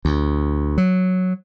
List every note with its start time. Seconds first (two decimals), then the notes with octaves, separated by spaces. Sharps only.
0.05 D2
0.78 F#3